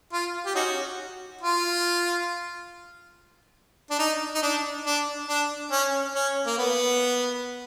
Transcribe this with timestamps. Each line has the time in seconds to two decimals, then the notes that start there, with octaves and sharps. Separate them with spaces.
0.13 F4
0.46 G4
0.55 C#4 D#4 F#4
1.41 F4
3.90 D4
3.99 D#4
4.35 D#4
4.42 D4
4.86 D4
5.29 D4
5.71 C#4
6.15 C#4
6.46 A#3
6.58 B3